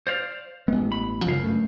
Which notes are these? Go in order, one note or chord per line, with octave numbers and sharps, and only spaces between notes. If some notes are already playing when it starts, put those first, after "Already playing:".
C5 D5 F5
A1 G2 G#3 B3
B5
C#2 F#2 C#3 F3 F5
G2 A3